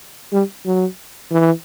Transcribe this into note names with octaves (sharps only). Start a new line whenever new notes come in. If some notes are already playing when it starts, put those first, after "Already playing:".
G3
F#3
E3